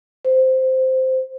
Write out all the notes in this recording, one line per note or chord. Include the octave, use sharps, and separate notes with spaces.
C5